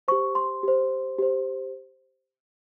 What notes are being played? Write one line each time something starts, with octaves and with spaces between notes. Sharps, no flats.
G4 C5 C#6
C6
G4 C5
G4 C5